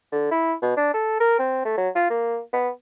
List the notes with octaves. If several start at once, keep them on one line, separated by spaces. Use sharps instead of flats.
D3
E4
B2
D4
A4
A#4
C4
A3
F#3
F4
A#3
B3